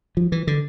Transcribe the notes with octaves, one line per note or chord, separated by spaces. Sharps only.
F3
E3
D3